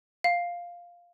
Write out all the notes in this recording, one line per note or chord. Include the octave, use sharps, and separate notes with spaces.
F5